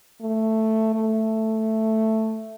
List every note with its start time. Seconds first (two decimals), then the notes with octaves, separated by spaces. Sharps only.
0.21 A3
0.95 A3